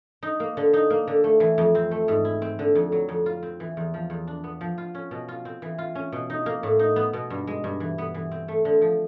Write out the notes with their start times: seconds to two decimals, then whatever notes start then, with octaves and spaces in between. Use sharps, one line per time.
0.23 D#4
0.40 A#3
0.57 D3
0.73 D#4
0.90 A#3
1.07 D3
1.24 A3
1.40 E3
1.58 F2
1.75 C4
1.91 A3
2.08 G#2
2.25 E4
2.42 C4
2.59 D3
2.75 F2
2.92 F#3
3.09 F2
3.26 F4
3.43 C4
3.60 E3
3.77 E2
3.94 F3
4.10 E2
4.27 D4
4.44 B3
4.61 F3
4.78 F4
4.95 C#4
5.11 B2
5.28 F4
5.45 C4
5.62 E3
5.78 F4
5.95 C#4
6.12 B2
6.30 D#4
6.46 A#3
6.63 A2
6.79 D#4
6.96 B3
7.13 B2
7.30 G2
7.47 G#3
7.64 G2
7.80 E3
7.98 B3
8.14 E3
8.31 C4
8.48 A3
8.65 D3
8.81 F3